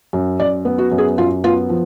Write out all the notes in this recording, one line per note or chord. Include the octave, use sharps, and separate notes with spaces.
F#2
F#2 D5
B3
F#4
F#2
G#4
F#2 F4
B3 F4
F3